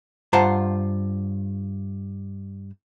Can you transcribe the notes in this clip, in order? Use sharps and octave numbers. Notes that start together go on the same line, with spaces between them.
G2 F4 C5 F#5 A5 A#5